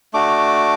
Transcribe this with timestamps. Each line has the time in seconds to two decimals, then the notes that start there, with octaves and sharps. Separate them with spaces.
0.13 A3 D4 F#4 D6